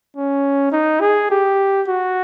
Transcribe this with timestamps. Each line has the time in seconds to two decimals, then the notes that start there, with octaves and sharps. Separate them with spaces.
0.17 C#4
0.72 D#4
1.01 G#4
1.30 G4
1.87 F#4